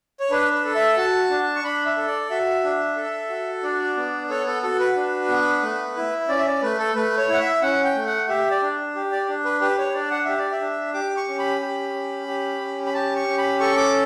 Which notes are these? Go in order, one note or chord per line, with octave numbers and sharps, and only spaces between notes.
C#5
D4 B4
B4
A4
E5
F#4 A5
D4
C#6
D4 B5
E5
A4
D5
F#4 E5
D4
A4
F#4
D4 D5
B3
A4 C#5
A4
F#4 A4
B4
D4
B3
A3
E4
C#4 D5
E5
D5
A3 B4
A4
A3 B4
C#5
E4
F#5
E5
C#4 F#5
G5
A3
F#5
G4 E5
D5
D4
G4
D5
D4
B4
G4 B4
C#5
D4 D5
F#5
G4 E5
D5
E5
D4
G4 D6
C#6
C#4
B5
G4
C#4
G4
C#4
B5
G4 A5
C#6
C#4
B5
A4 C#6
D6